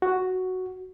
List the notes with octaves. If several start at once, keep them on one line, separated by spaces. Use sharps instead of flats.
F#4